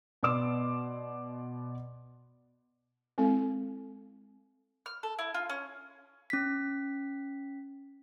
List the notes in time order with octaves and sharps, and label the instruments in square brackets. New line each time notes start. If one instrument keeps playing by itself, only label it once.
[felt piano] B2 B3 D5 C6 D6 E7
[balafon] G#3 C4 E4 A4
[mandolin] F6
A4
E4
F4
C#4
[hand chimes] C#4 B6